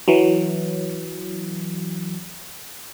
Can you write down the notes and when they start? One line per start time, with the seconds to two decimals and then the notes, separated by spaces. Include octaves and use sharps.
0.08 E3 F#3